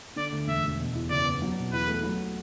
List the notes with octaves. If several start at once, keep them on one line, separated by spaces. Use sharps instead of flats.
D3 D5
D2
E1 E5
E1
B2
E2
F#1 D5
B3
F#3
B2
E2 B4
A3
F#3